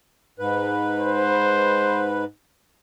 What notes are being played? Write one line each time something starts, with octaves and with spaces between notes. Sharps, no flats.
G#2 B4
C5